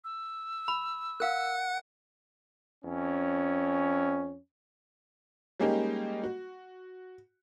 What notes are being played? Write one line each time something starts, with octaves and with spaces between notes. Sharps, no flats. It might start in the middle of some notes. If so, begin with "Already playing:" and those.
E6
B5
A#4 F5 F#5 F#6
F2 C#4
G3 G#3 A#3 C#4 D#4 G4
F#4